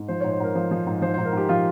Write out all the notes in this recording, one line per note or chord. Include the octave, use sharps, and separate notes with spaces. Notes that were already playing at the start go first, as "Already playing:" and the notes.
Already playing: G#2
F3 C5
G#2 C#5
C5
G#2 A#4
F3 C5
F3
G#2
F3 C5
G#2 C5
A#4
G#2 G4
F3 F4